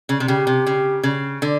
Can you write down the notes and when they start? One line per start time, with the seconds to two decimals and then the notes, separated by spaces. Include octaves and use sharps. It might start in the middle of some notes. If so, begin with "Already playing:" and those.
0.09 C#3
0.20 C3
0.28 C#3 G4
0.47 C3
0.66 C#3
1.03 C#3
1.42 D3